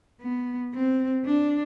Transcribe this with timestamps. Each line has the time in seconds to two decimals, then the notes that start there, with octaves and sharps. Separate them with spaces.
0.21 B3
0.73 C4
1.25 D4